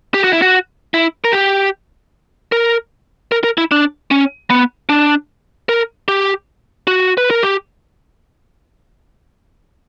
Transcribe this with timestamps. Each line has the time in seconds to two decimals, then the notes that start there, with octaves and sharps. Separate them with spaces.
0.14 G4
0.24 F#4
0.33 E4
0.42 F#4
0.94 E4
1.24 A#4
1.32 G4
2.52 A#4
3.32 A#4
3.44 A#4
3.58 E4
3.72 D4
4.11 C#4
4.50 B3
4.89 D4
5.69 A#4
6.08 G4
6.87 F#4
7.18 B4
7.31 A#4
7.43 G4